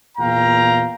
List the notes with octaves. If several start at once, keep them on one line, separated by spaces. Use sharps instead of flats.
E2 A#2 F5 G5 A#5